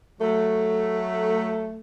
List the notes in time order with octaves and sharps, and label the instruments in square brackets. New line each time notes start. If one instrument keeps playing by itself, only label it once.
[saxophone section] F#3 A3